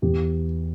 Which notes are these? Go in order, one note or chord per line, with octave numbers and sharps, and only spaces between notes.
E2 G4